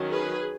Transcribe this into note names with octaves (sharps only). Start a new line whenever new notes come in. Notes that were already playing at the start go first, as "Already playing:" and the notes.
Already playing: D#3 F#3 C#4
G#4 B4